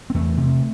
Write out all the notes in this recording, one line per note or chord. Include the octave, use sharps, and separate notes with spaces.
C4
E2 A3
C3